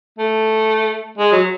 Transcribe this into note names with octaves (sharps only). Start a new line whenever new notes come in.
A3
G#3
F#3